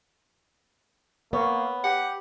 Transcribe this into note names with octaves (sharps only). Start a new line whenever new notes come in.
A#3 B3 C#5
G4 F#5